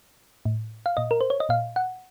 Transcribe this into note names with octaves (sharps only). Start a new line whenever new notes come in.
A2
F5
A#2 D#5
A#4
C5
C#5
D#5
A#2 F5
F#5